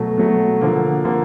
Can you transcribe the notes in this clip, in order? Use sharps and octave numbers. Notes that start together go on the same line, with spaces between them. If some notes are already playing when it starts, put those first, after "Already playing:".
Already playing: B2 F#3 A3
B2 F#3 A3
D3 F3 A#3
D3 F3 A#3